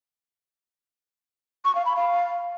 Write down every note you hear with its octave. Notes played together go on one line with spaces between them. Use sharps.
C#6
F5
B5
F5